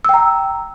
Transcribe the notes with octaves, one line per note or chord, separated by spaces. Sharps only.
G5 A#5 E6